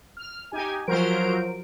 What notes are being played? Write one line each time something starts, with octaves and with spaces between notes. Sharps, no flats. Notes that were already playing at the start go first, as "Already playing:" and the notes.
F6
D#4 G4 G#5
F3 F#3 A#4 C5 D7